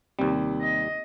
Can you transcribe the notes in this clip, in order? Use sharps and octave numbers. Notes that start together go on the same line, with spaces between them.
D#2 C3 G3
D#5